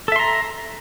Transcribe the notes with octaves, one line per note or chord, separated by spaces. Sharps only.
A4 E5 A#5 C6